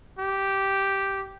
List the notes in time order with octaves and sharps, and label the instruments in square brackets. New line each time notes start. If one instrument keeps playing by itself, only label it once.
[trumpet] G4